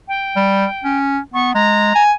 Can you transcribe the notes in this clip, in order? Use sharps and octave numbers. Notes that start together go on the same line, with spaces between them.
G5
G3
C#4
B3 C#6
G#3 A#5
G#5